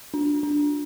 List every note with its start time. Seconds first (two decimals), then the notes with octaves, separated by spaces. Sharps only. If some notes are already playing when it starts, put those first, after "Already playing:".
0.14 D4
0.43 D4